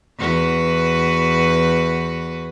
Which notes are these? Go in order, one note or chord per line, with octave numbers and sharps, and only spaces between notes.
E2 F#4 B4